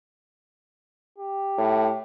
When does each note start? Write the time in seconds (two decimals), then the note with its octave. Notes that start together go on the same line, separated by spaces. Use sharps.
1.18 G4
1.58 A2